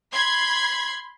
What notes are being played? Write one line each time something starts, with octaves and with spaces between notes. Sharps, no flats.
B5 C6 G#6